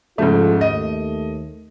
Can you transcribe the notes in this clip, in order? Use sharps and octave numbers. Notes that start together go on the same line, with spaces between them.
G#2 C#3 F3 A3 F4 A4
D#2 A3 D#5